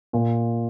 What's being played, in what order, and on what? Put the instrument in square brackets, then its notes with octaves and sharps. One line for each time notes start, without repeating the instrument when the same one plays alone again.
[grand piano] A#2